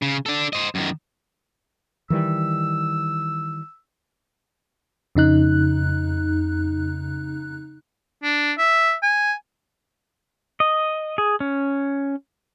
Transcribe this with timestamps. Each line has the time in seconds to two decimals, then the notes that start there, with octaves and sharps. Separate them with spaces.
0.02 C#3
0.26 D4 A4
0.53 C5 D#5
0.75 F#2 D#3
2.10 D#3 E3 G3 E6
5.15 F2 C#3 D#4 F#6
8.23 D4
8.58 E5
9.03 G#5
10.60 D#5
11.18 G#4
11.40 C#4